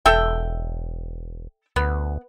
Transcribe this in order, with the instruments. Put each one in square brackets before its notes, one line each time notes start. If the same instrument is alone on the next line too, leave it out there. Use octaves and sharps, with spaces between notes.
[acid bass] E1 [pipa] A4 E5 G5
[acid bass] D2 [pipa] B3